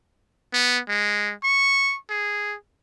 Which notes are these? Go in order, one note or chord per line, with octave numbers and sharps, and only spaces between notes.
B3
G#3
C#6
G#4